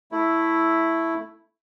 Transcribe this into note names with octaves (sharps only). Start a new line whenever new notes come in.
A3 E4